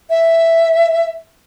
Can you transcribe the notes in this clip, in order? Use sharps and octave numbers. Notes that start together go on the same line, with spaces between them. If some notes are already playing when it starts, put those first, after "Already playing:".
E5